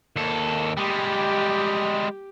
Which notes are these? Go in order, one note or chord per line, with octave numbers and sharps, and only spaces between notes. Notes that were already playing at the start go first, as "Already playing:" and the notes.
D#2 A#3 A4
G3 G#3 G4